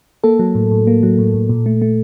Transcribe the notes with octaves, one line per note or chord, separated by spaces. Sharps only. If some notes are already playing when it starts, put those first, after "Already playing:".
A#3 A4
F#3
A2
A2
A#3
F#3
A2
A2
A#2
A3
A3